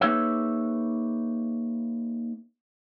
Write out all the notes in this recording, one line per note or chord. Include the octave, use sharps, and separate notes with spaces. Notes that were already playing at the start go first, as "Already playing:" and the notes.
A#3 D#4 G#4 B4 C#5 E5